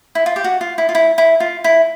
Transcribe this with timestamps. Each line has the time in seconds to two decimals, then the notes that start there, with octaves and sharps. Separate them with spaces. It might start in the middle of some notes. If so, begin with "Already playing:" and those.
0.15 E4
0.26 F4
0.36 G4
0.44 F#4
0.61 F4
0.78 E4
0.89 F4
0.95 E4
1.18 E4
1.40 F4
1.64 E4